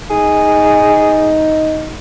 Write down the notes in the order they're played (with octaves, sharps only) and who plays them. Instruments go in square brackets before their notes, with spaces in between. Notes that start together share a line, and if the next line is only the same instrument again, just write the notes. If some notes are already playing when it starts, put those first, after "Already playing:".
[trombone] D#4 [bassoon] G#4